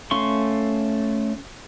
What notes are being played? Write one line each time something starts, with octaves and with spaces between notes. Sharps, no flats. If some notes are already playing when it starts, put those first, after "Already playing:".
A3 C#4 F5 C6 C#6